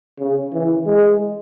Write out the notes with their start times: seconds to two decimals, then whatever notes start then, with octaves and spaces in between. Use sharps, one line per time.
0.19 C#3
0.53 E3
0.86 G#3